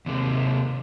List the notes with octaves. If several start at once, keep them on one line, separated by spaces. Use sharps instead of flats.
D#2 C3